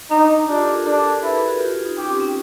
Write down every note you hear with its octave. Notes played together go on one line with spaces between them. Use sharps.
D4 D#4
D4 F4 G4
G4 A4
G#4 A#4
D4 G4 A4
G#4 A#4
E4 A4 B4
G#4 A#4
F#4 G#4
F4 G4
F#4 G#4
D#4
C#4 G4
C4
C#4